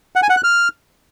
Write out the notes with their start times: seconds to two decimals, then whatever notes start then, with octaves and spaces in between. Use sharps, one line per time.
0.16 F#5
0.23 G#5
0.30 F#5
0.37 F#6
0.44 F6